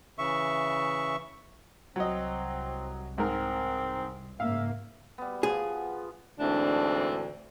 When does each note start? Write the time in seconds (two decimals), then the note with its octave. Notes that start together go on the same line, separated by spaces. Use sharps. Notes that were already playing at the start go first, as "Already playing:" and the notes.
0.18 C#3 E3 E5 C#6
1.96 C2 F#3 C4 D#5
3.18 G#2 C4 A#4
4.40 G#2 C#3 A#3 E5 F5
5.18 G3 B3
5.43 F3 B3 G#4
6.39 D2 G#2 E3 C4 D4